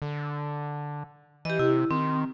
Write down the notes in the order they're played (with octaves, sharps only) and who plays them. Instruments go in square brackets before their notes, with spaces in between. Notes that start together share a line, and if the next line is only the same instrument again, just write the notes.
[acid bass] D3
[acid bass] E3 [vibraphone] G4 D#5
[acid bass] C3 [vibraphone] E4
[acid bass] D#3 [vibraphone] C4